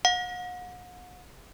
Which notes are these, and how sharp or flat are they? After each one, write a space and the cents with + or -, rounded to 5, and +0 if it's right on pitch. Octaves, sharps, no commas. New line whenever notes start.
F#5 -40